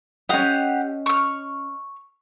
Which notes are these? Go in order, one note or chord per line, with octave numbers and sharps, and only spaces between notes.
C#4 G4 D#5 F5 F#5
C#6 F6